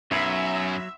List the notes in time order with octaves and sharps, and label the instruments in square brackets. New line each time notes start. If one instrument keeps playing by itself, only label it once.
[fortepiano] B1 [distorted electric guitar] F#2 [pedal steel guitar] F#3 C#5 B5 [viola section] E5